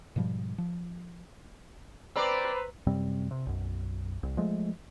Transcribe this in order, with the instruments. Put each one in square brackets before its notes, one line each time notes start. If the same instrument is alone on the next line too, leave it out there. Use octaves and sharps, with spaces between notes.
[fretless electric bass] G#2 B2 F3 G3
F3
[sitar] C4 D5 [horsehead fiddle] B4 C5 [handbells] A#5 B5 E6
[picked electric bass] F#2 C3 G3 C4
C3
B1 F#2
C2
F3 G#3 A3